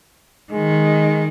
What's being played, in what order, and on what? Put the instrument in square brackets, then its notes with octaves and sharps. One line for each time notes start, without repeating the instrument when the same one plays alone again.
[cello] D#3 [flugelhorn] G#3